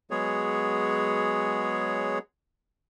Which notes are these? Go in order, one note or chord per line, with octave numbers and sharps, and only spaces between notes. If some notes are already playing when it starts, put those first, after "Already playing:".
F#3 G#3 B3 G#4 C#5